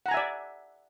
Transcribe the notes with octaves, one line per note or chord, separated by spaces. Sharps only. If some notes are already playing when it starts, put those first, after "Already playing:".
D5 E5 F#5 G#5 A#5